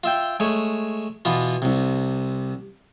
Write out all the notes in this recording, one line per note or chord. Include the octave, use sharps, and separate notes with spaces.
F4 E5 G5
G#3 A3 C#5
B2 E3 B3 F4
C2 C3